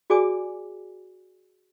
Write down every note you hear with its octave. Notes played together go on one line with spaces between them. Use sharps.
F#4 G#4 D5 G#5 D6 D#6